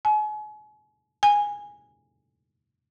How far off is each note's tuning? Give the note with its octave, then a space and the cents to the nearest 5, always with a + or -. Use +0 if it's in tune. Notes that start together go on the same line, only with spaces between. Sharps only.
G#5 +40
G#5 -10